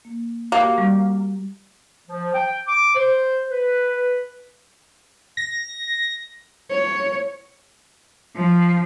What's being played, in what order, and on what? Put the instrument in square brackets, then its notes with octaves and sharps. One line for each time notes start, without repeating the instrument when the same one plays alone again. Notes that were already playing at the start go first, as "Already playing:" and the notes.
[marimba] A#3
[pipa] A#3 [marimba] F#4 G4 G5
[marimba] G3 C#6
[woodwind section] F3
G5
D6
C5
B4
[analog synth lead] A#6
[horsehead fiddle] C#5
[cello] F3